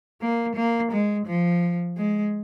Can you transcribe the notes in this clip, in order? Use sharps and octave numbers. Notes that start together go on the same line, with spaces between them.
A#3
A#3
G#3
F3
G#3